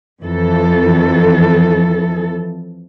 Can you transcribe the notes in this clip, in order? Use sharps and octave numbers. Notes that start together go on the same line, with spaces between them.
F2 E3 A4